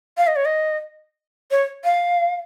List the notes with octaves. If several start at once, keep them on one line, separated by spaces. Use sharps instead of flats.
F5
D#5
C#5
D#5
C#5
F5